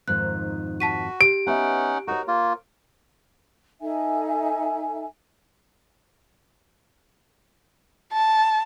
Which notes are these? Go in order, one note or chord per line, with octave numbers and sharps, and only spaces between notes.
F2 G#2 D#3 F#6
F#4 A5 B6 D#7
G4 D7
B3 C#4 D#4 E5 F#5
D#4 F#4 A#4 C#5
A#3 F4
D#4 A4 E5 G#5
A5